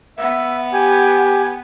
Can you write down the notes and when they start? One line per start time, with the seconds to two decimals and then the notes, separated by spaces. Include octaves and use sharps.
0.18 B3 E5
0.73 G4 G#5